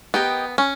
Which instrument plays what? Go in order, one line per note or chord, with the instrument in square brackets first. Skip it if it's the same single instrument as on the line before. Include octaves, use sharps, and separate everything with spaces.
[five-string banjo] B3 [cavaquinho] G4 A#4 D#5 G5
[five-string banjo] C#4